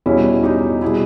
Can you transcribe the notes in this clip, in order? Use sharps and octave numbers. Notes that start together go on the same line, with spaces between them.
E2 B2 G3 C#4 E4
D#4 G4
B2 G3 E4 G#4